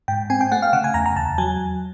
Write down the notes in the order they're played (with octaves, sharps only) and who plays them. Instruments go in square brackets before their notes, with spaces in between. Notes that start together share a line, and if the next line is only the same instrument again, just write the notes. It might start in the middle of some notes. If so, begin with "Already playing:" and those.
[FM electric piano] G#2 G5
C4 G#5
G5
A3 F#5
F5
C#3 F#5
G#5
E2 A#5
A#5
E2 A5
F#3 G#5